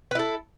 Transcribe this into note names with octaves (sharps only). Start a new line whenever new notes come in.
E4 A4 B4